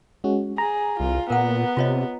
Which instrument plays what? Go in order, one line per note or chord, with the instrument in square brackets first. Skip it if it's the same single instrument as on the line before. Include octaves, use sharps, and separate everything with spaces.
[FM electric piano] G#3 C#4 F#4
[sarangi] G#4 [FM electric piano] A#5
[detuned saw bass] C2 [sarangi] F4
[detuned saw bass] A#2 [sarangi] B3 [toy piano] A#4 F#5
[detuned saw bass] C3 [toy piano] F4 C#5 D#5